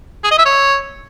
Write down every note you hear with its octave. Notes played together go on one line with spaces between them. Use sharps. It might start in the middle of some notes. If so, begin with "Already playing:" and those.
G#4
D#5
E5
C#5